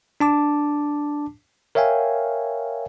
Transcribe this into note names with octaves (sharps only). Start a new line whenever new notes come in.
D4 A5 D6
A#4 C#5 E5 F5 G5 G#5